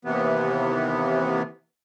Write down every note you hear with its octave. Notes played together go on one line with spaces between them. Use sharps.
D#2 C3 E3 B3